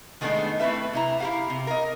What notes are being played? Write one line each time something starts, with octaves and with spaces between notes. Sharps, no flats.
D#3 G#3 A3 B3 D4 D#4
A3 C4 E4 B4 E5
C3 E4 A#5
E4 G4 F5
C3
A#4 D#5